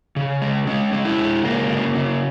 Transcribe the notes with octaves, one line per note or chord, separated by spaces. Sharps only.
C#3
G#3
G#3 C#4
G#3
E4
G#3
C#3 A#3
C#3
C#3